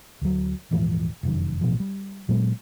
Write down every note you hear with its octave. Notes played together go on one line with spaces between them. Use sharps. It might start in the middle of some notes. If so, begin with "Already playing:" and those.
D2 F#3
D#1 G#2 E3 F3
F1 F#2 D#3
A1 B2 F3
G3
A#2 F#3 G#3 B3